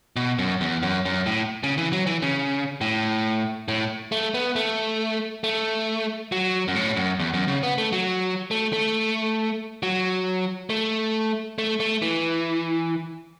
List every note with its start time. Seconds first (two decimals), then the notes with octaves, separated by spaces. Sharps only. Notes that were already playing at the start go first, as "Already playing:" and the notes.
0.16 B2
0.39 F#2
0.61 E2
0.82 F#2
1.05 F#2
1.26 A2
1.63 C#3
1.78 E3
1.93 F#3
2.07 E3
2.22 C#3
2.81 A2
3.68 A2
4.12 A3
4.34 B3
4.56 A3
5.44 A3
6.32 F#3
6.68 F#2
6.75 A2
6.97 F#2
7.19 E2
7.34 F#2
7.48 C#3
7.63 B3
7.78 A3
7.92 F#3
8.51 A3
8.73 A3
9.83 F#3
10.70 A3
11.58 A3
11.80 A3
12.02 E3